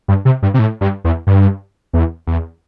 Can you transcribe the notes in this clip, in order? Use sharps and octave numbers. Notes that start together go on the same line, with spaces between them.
G2
C3
G2
C3
A2
G2
E2
G2
E2
E2